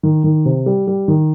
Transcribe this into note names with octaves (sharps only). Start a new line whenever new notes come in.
D#3
D#3
C3
G3
G3
D#3